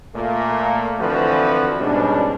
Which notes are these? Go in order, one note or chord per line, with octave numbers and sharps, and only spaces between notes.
A#2 A3 A#3
D3 E3 F3 C4 F#4 B4
G#2 B2 G3 C#4 D4